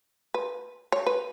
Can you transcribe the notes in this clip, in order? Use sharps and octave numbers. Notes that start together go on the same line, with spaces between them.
B4
C#5
B4